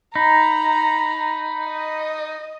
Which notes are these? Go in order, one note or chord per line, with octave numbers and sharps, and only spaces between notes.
D#4 A#5 B5
D#5